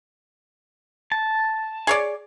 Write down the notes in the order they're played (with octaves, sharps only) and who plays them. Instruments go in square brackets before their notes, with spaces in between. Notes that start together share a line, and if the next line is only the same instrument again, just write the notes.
[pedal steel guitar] A5
[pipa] G#4 C#5 D5